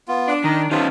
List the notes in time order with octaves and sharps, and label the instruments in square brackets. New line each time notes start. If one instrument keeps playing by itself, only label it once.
[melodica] B3 F4
[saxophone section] D4
[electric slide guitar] D#3 [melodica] D#4 D#5
[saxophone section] C3 B3 [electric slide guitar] D#3 C#4 D#4 [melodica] F4 A5